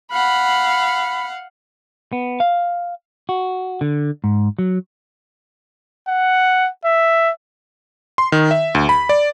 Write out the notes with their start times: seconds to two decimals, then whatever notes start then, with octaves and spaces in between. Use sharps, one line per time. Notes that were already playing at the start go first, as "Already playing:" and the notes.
0.12 F5 F#5 B5
2.13 B3
2.40 F5
3.29 F#4
3.81 D3
4.24 G#2
4.59 F#3
6.08 F#5
6.85 E5
8.18 C6
8.32 D#3
8.51 E5
8.75 D2
8.89 B5
9.09 D5